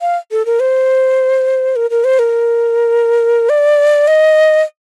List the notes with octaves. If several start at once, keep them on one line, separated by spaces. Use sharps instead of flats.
F5
A4
A#4
C5
A#4
A#4
C5
A#4
D5
D#5